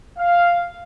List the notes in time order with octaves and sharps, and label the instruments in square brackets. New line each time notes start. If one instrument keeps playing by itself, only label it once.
[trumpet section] F5